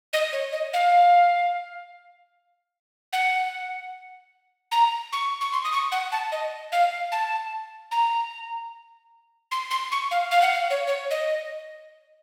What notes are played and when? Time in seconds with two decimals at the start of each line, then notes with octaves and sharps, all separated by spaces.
0.13 D#5
0.33 C#5
0.53 D#5
0.73 F5
3.13 F#5
4.72 A#5
5.13 C#6
5.41 C#6
5.53 C6
5.64 D#6
5.72 C#6
5.92 F#5
6.12 A5
6.32 D#5
6.72 F5
7.12 A5
7.91 A#5
9.52 C6
9.71 C6
9.92 C#6
10.11 F5
10.31 F5
10.41 F#5
10.53 F5
10.70 C#5
10.87 C#5
11.11 D#5